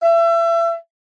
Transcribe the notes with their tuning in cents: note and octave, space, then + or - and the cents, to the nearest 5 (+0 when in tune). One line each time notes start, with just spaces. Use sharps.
E5 +30